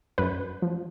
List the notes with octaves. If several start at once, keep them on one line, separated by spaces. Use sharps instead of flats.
F#2 B4
F3